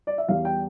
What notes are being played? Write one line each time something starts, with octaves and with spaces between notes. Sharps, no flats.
D5
E5
E2 E3 G3 F5
G5